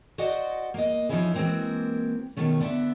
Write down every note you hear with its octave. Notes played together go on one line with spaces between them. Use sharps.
F#4 C5 D5 D#5 F#5
A#3 D#5
F3 F#3 C#4 D#4 E4 G#4
E3 G#3 A#3 C4 F#4 A#4
B2 D#3 A3 C#4
D3 B3 E5